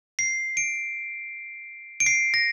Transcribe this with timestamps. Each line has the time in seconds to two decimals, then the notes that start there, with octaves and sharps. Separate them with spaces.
0.19 C7
0.57 D7
2.00 D7
2.06 C7
2.34 A#6